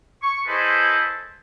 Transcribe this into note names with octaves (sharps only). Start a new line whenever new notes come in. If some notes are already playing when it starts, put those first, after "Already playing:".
C#6
E4 G#4 A4 B4 C5 D#5